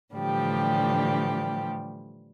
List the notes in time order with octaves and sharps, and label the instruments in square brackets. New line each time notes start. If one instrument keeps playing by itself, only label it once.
[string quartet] A2 D3 E3 F3 G3 G4